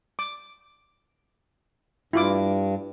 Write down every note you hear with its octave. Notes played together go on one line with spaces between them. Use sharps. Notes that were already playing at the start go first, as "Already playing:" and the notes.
D6
G2 E4 F4 D6